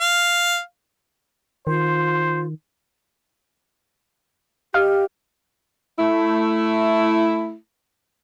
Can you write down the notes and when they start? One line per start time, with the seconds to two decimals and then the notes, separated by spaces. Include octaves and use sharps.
0.01 F5
1.67 D#3 F4 C5
4.74 G4 D#5 F5 F6
5.99 A3 E4